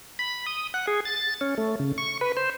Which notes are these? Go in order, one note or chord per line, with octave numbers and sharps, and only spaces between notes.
B5
D#6
F#5
G#4
A6
C#4
A3
C#3
C#6
B4
C5